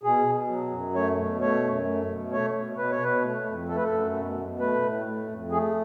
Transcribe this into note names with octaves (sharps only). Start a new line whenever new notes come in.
B2 G#4
B2
F#3
F#2
A3 C#5
B2
A3 C#5
F#2
A3
B2
A3 C#5
B2
B2 B4
C#5
B2 B4
A3
F2
A3 A4
B4
A4
F#2
B2
B2
A3 B4
A2
A3
F2
A3 G#4